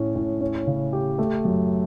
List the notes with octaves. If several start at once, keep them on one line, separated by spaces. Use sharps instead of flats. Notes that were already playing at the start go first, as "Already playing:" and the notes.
Already playing: A2 C#4
A2
C#4
C#3
G4
A3
F#2